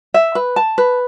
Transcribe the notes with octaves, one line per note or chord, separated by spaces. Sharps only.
E5
B4
A5
B4